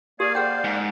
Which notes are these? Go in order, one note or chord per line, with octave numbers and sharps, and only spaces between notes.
A#3 G4 G#4 D5 F5
G#4 C5 F#5 G5
G#2